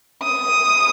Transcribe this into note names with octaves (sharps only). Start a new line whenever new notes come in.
D#6